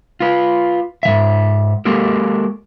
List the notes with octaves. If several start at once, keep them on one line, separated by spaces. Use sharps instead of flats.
F4 B4
G#2 E3 E5
G#3 A#3 G4 A4 A#4